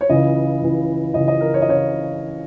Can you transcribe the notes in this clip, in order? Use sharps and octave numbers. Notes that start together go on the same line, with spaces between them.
C#5
C#2 C#3 E3 D#5
C#2 C#3 E3
C#2 C#3 E3 D#5
D#5
A#4
C#5
D#5
C#3 C#5